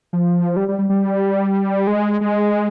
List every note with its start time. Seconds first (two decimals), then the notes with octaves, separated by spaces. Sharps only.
0.13 F3
0.56 G3
0.68 G3
0.79 G3
0.89 G3
1.87 G#3
2.21 G#3